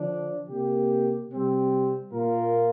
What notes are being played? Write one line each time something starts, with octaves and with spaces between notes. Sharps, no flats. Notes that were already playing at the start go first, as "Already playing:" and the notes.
Already playing: D3 F3 D4
C3 A#3 G4
C3 G3 C4
A#2 A#3 F4 A#4